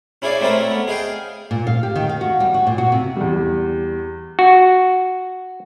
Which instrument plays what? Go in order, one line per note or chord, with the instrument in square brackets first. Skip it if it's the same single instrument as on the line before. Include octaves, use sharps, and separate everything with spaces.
[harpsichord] C#4 E4 G#4 C#5 D5 F5
A3 C4 C#4 E4 A4 A#4
B3
G#4 D#5 F5 G5
[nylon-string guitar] A#2
F5
G4
D#3
F5
F#4
G3
F#4
A#2
F#4
C3
[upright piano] E2 G3
[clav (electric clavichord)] F#4